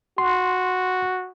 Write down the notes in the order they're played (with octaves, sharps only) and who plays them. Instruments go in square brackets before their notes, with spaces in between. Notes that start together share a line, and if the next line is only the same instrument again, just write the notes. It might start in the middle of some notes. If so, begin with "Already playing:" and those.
[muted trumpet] F#4 [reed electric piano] C6